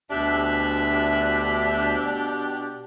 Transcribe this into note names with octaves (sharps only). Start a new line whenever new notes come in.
D2 B2 D4 G4 E5 F#6